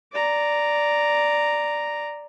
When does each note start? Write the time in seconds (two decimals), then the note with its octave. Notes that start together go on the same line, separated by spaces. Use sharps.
0.12 D5 A#5